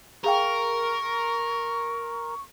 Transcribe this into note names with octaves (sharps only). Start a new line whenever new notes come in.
G#4 A#4 F5 G5 C#6